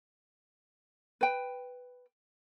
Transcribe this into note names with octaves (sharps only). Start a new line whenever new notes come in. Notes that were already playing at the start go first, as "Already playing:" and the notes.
B4 G5